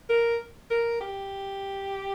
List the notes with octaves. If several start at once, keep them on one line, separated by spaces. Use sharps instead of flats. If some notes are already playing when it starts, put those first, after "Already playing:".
A#4
A#4
G4